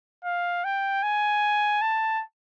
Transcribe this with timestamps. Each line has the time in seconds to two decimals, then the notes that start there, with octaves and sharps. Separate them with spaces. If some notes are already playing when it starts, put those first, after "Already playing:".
0.25 F5
0.65 G5
1.03 G#5
1.82 A5